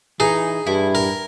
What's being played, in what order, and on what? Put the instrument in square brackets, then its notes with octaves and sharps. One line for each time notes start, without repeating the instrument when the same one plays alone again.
[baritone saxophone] E3 [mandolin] D#4 [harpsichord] G#4
[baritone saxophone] G2 [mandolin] E4
[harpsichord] A#4